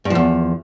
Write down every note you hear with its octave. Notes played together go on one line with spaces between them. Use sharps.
E2 G2 F3